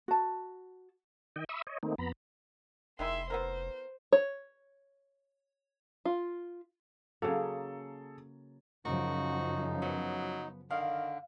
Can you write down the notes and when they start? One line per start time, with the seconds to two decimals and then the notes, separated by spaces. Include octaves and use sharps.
0.08 F#4 A5
1.36 D#3 D#5 G5
1.49 E5 B5 C#6 D#6 E6
1.67 C#5 D#5
1.83 D#3 A3 A#3 C4 D#4
1.98 F2 B3 A#5 B5
2.99 F1 D#3 G#3 E4 E5 C6
3.30 B3 E4 A#4 C5
4.12 C#5
6.05 F4
7.22 C#3 F#3 A#3 G#4 A4
8.85 F#2 C#3 F3 D#4 F#4 A#4
9.82 F#3 B3
10.71 D3 D#3 F5